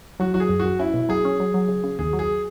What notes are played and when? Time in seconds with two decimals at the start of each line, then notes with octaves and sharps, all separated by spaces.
0.20 F#3 F#4
0.34 F#3 F#4
0.40 G#4
0.49 F#2
0.60 F#2 F#4
0.79 C#4 E4
0.94 B2
1.09 F#3 G#4
1.25 C#4
1.40 F#3
1.54 F#3
1.68 C#3
1.84 C#3
1.99 D#2 G#4
2.13 F#3
2.19 G#4